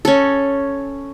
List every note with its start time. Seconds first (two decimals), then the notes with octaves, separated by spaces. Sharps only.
0.05 C#4 A4